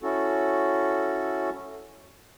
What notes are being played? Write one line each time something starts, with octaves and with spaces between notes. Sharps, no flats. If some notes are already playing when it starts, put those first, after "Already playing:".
C#4 E4 F#4 A4